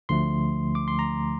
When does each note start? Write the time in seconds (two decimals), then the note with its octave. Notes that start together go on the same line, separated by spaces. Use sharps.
0.09 D2 D3 F3 A3 C6
0.75 D6
0.88 C6
0.99 A#5